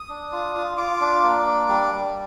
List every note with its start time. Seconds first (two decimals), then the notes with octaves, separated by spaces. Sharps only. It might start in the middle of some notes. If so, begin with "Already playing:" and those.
Already playing: D#6
0.10 D4
0.32 F4
0.55 F4
0.77 F4 D6
1.01 D4
1.23 A#3
1.46 D4
1.69 G3
1.92 G3